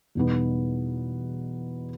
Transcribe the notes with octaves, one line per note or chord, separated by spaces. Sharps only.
E2 B2 G3 B3 D#4